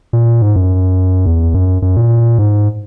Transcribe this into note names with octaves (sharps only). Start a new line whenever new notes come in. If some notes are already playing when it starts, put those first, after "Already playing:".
A#2
G#2
F#2
E2
F#2
F#2
A#2
G#2